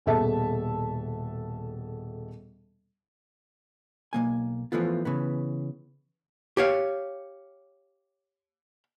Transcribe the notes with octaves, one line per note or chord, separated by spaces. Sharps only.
D#1 B2 G#4 A4 E5 A5
B1 F3 A#3 G#5
E3 F3 A3 B3 F4
C#3 E3 B3
G4 C#5 F5